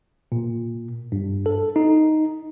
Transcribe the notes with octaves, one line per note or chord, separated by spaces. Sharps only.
A#2
G2
A4
D#4